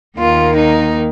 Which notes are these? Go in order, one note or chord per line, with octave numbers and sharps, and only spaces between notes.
D#2 D#3 A#3 F4
D#4